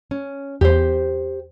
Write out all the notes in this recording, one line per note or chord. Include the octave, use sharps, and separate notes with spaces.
C#4
E2 G4 C5